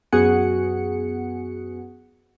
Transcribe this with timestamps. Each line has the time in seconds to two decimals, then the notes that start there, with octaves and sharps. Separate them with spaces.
0.12 F#2 B3 F#4 G#4 F#5 C#7